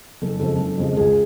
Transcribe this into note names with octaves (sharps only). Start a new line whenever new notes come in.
F#1 A4
F2 C#3 F3 G#3 A4
F#1
F2 C#3 F3 G#3
C#2 G#4